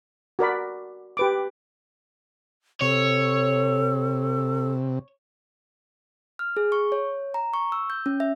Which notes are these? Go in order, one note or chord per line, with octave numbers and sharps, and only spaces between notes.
F#4 A#4 D5 B5
G4 B4 D6
C3 A4 C#5
F6
G#4
C#6
C#5
A#5
C#6
E6
G6
C#4
E5